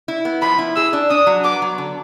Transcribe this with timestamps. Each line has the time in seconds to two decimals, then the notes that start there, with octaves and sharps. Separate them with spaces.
0.08 E4
0.25 B3
0.42 F3 B5
0.58 E4
0.76 G#4 E6
0.93 D4
1.10 D4 D#6
1.27 F#3
1.44 B3 D6
1.62 F#3
1.78 D3